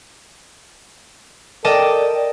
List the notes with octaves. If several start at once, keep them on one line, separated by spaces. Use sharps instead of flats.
A4 A#4 D5 D#5 G5 A5 D6